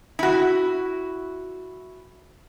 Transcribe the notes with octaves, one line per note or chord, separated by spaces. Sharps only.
E4 F#4